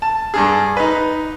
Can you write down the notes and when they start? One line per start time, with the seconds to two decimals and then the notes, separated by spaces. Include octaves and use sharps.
0.02 A5
0.34 G2 D4 G#4
0.77 D#4 B4